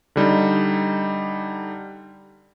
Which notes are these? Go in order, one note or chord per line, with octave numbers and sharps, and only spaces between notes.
D3 G3 D#4